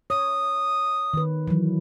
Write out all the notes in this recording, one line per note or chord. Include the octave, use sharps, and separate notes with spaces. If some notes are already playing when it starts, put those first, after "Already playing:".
C#5 D#6
D#3 B4
E3 F#3